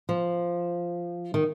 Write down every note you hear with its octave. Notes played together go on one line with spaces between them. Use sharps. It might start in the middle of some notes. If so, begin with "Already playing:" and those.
F3
D#3